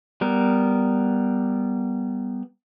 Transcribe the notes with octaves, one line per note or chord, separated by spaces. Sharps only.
G3 B3 A#4